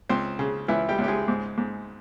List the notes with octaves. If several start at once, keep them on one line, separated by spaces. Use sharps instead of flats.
C#2 C4 C5
C#3
C#2 E3 E4
G3 G4
C#2
G4
G#3 G#4
G#2
G#2